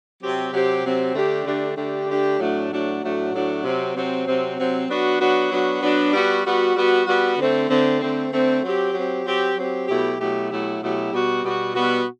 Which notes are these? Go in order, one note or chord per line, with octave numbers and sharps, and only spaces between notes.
C3 F#3 C4 G4
C3 F#3 C4 G4
C3 F#3 C4 G4
D3 A3 D4 G4
D3 A3 D4 G4
D3 A3 D4 G4
D3 A3 D4 G4
A2 F#3 A3 D4 F#4
A2 F#3 A3 D4 F#4
A2 F#3 A3 D4 F#4
A2 F#3 A3 D4 F#4
C3 F#3 C4
C3 F#3 C4
C3 F#3 C4
C3 F#3 C4
F#3 B3 D4 F#4
F#3 B3 D4 F#4
F#3 B3 D4 F#4
F#3 B3 D4 F#4
G3 B3 F#4
G3 B3 F#4
G3 B3 F#4
G3 B3 F#4
D3 A3 C4
D3 A3 C4
D3 A3 C4
D3 A3 C4
F#3 C4 G4
F#3 C4 G4
F#3 C4 G4
F#3 C4 G4
B2 F#3 A3 E4 G4
B2 F#3 A3 E4 G4
B2 F#3 A3 E4 G4
B2 F#3 A3 E4 G4
B2 G3 B3 F#4
B2 G3 B3 F#4
B2 G3 B3 F#4